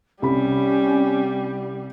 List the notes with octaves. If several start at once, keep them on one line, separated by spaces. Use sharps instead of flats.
C2 G3 C#4 B5